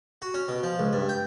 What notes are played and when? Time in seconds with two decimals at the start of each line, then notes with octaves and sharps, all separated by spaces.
0.22 F#4
0.34 C#4
0.48 B2
0.63 F3
0.79 C#2
0.93 G2
1.09 G5